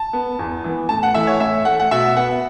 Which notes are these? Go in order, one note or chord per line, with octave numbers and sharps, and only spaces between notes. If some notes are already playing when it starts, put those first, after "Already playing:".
Already playing: A5
B3
E2
E3 B3
A2 A5
F#5
E3 A3 E5
C#5
A2 E5
A3 F#5
F#5
B2 E5
B3 F#5